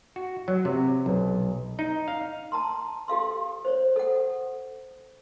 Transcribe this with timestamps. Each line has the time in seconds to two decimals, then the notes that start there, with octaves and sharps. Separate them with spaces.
0.16 F#4
0.48 F#3
0.65 C3
1.06 B1
1.79 D#4
2.08 F5
2.52 A5 A#5 C6
3.08 G4 A4 F5 C6
3.65 C5 C#5
3.96 A4 F#5